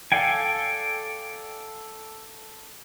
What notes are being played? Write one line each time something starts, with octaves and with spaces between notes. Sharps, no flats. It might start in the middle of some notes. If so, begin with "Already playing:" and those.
A4 D5 F5 G5 G#5